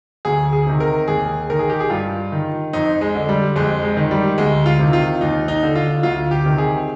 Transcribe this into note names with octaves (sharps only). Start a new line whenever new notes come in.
D2 G#4
G#4
C3 D#3
A#4
D#2 G#4
D#3 A#4
G#4
G4
G#4
G2 F4
D#3
F2 D#4
G#3
D3
G3
F2 G#3
G#3
D#3
G3
D2 G#3
F4
C3 D#3
F4
D#2 D#4
D#4
D3
F4
D2 F4
G4
C3 D#3
G#4